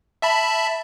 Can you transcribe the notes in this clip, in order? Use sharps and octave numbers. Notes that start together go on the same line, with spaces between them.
E5 A5 B5